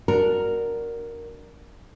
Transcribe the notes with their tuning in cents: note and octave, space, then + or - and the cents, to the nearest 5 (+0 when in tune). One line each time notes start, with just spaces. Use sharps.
D4 +0 F#4 +0 A#4 +0